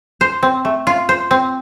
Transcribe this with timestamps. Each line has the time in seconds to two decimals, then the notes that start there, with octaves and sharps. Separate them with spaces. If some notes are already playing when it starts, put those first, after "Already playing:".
0.21 C5
0.43 C4
0.65 A3
0.87 F4
1.09 C5
1.31 C4